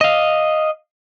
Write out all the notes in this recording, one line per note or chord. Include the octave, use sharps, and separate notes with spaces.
D#5 F5